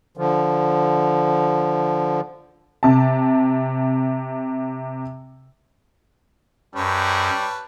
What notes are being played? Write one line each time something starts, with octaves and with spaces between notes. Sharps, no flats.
D3 F3
C3 A5
F#2 G3 B4 C#5 A5